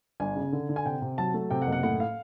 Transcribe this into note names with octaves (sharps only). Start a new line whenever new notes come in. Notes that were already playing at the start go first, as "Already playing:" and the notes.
G1 G#5
C#3
D3
D3
G#5
C3 G5
C3
F#3 A5
A3
C3 G5
F#5
F#1
F#5
A2 F#5
F5